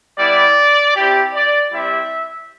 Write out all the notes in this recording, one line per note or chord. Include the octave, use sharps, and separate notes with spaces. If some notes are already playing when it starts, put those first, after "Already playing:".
G3 B3 E4 D5
C4 E4 G4
D5
G3 C4 E4 G4 E5